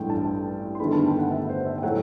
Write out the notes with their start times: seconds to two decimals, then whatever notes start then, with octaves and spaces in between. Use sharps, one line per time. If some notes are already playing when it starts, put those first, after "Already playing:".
Already playing: A1 G2 E3 A3 G5
0.10 A5
0.75 C6
0.80 G1 G2 D#3 A3 B5
0.93 A5
1.05 G5
1.19 F#5
1.31 E5
1.49 C5
1.66 E5
1.78 G5
1.83 A2 F#3 A3 F#5